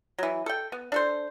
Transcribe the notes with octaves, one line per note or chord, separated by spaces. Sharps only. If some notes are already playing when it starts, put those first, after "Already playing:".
E3 F#3
A4 G5
B3
D4 A4 C5